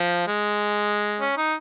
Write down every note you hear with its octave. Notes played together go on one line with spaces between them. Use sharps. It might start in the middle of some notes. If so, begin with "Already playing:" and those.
Already playing: F3
G#3
C#4
D#4